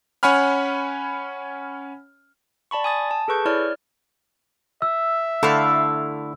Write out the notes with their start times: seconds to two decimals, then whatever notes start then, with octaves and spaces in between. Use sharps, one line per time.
0.23 C#4 C#5 F#5 G#5 B5 F6
2.71 D5 A5 B5 C#6
2.84 G#5 D#6 A6
3.11 A5
3.28 G#4 A4 B4 C#6 G6
3.45 E4 C#5 D5 F6
4.82 E5 E6
5.43 D3 A3 E4 A4 F5